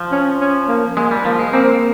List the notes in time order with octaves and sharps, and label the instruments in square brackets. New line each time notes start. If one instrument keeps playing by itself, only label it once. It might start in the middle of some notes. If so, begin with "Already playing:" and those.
Already playing: [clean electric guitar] F3
[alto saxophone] C#4
C#4
A#3
[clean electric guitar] G#3 [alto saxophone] A#3
[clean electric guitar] G3
[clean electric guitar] F3 [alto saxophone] A#3
[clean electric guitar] G#3
[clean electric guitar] A#3 [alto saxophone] C4